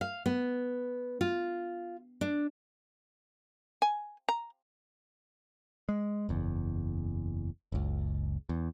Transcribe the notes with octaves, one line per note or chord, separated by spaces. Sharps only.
F5
B3
F4
D4
G#5
A#5
G#3
F#1 E2
F#1 C#2
E2